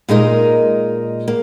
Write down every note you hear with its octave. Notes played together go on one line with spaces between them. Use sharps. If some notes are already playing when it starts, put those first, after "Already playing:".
A#2 G#3 D#4 A#4
A#3